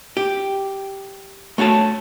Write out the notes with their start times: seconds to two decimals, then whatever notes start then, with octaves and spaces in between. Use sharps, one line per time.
0.17 G4
1.58 A3 F#4 C#5 A5